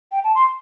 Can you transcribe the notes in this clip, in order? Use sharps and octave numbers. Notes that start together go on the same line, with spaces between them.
G5
A5
C6